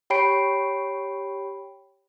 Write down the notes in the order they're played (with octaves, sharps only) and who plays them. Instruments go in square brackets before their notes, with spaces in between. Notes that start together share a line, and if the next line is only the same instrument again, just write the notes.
[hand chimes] G4 C#5 G5 B5 C7 D7